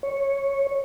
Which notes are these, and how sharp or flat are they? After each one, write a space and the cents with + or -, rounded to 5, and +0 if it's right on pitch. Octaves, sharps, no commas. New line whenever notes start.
C#5 -10